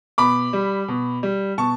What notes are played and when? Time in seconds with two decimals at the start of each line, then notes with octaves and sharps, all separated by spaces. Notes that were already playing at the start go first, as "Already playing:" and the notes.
0.18 B2 B5 D6
0.53 G3
0.88 B2
1.23 G3
1.58 B2 A5 C#6